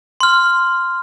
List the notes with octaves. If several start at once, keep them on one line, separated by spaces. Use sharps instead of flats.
C6 F6